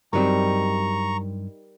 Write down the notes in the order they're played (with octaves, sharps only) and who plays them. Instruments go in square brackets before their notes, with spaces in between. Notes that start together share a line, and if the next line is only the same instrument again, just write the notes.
[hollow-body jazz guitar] G2 F#3 C4 [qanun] G3 D#4 A#4 [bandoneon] A#5 C#6